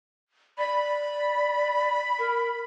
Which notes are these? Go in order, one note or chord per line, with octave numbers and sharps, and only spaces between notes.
D5 B5
A#4